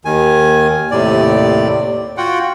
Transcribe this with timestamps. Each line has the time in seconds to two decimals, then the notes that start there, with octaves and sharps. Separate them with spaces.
0.05 D#2 D#3 G#5
0.91 D#2 A2 C3 D5
2.17 F4 F#4 F#5 G5